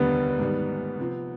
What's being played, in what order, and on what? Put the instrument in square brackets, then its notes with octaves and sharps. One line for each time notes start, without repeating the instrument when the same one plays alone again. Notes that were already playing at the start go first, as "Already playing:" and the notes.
Already playing: [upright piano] F1 D#2 D3 G3 D4 [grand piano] B3
[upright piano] G#2 D#3 G3
C3 F3 C4